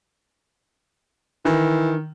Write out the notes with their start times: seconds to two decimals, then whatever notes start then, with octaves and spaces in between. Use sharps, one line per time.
1.45 D#3 E3